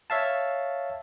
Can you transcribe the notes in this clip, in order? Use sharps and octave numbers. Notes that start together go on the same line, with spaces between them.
C#5 E5 F5 A5